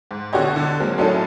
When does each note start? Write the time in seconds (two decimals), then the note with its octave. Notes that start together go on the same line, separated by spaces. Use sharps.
0.11 G#2
0.33 B2 D3 F#4 G4 C#5 D#5
0.56 D3
0.80 F#3 G#3 A#3 C4
0.98 A2 F#3 C#4 D#4 A4